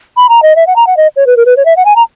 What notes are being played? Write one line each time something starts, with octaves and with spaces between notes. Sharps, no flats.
B5
A#5
D#5
E5
F#5
A#5
F#5
D#5
C#5
B4
A#4
B4
C#5
E5
F#5
G#5
A#5